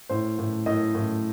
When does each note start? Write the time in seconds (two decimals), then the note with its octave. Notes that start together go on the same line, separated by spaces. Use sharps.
0.09 A2 C5
0.39 A2
0.66 A2 D#5
0.95 A2